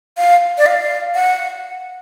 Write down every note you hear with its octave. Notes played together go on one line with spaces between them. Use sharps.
F5
D5
F5
F#5